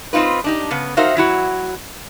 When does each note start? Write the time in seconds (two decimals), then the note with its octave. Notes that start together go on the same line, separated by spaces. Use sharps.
0.13 C4 C#4 D#4 F4 B4
0.44 D4 D#4 G4
0.71 C#3 B3
0.97 D#4 F#4 A#4 C5 E5 F5
1.17 F#3 E4 F#4